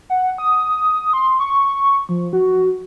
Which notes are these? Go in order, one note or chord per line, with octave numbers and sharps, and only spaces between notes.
F#5
D#6
C6
C#6
F3
F#4